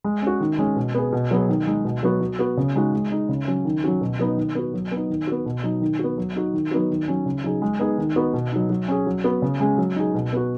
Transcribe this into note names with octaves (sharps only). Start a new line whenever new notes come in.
G#3
C#4 F#4
D#3
G#3 C#4 G#4
B2
B3 G#4
B2
F#3 B3 G#4
D#3
G#3 D#4
B2
F#3 B3 F#4
F#3
B3 F#4
C#3
G#3 D#4 F#4
G#3
D#4 G#4
C#3
F#3 C#4
D#3
F#3 C#4 F#4
B2
F#3 B3 D#4
D#3
B3 F#4
F#3
B3 D#4
D#3
B3 F#4
B2
F#3 D#4
D#3
B3 F#4
F#3
D#4 F#4
D#3
F#3 B3 D#4 F#4
D#3
F#3 C#4
C#3
F#3 D#4 G#4
G#3
B3 D#4 G#4
D#3
B3 D#4 F#4
B2
F#3 D#4
F#3
C#4 G#4
F#3
B3 F#4
C#3
G#3 C#4 G#4
F#3
D#4 G#4
B2
B3 F#4